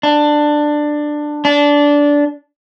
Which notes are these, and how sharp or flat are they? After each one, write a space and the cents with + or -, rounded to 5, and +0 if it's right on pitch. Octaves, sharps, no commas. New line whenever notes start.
D4 +15
D4 -15